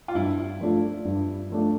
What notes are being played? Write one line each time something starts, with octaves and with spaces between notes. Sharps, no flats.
F4
G2 E4
F3 A3 D4 F4
G2
F3 A3 D4 F4